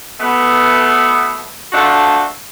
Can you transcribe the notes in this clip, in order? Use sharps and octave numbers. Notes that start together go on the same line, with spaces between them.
B2 A3 B3
F3 A3 D4 F#4